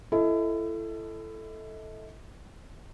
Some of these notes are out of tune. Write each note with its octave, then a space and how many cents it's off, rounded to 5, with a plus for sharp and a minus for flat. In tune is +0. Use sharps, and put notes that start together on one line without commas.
E4 +30 A4 +0 D#5 +35